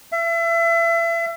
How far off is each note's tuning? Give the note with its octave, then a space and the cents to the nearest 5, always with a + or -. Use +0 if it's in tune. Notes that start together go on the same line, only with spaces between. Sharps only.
E5 +30